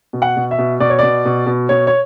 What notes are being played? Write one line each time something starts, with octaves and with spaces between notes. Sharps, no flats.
B2
F#5
B2
E5
B2
B2 D5
C#5
B2 D5
B2
B2
B2 C#5
C#5